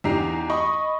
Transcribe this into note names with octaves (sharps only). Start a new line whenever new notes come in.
E2 D4 D#4 G4 A#5 C7
D#5 B5 C#6